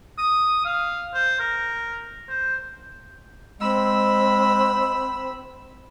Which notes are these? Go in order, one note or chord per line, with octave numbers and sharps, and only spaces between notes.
D#6
F5
C5
A#4
C5
G#3 C4 B5 E6